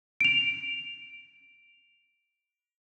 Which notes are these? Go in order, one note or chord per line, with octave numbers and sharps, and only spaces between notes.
D7 F7